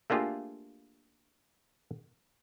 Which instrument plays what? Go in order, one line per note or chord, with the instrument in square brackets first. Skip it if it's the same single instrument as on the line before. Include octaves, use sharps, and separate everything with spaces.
[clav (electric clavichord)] A3 A#3 D4 F4 G4 G#4